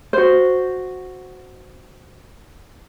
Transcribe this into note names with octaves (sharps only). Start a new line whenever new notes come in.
F#4 C5